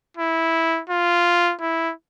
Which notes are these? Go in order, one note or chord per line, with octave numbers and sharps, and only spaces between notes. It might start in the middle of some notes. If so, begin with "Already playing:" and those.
E4
F4
E4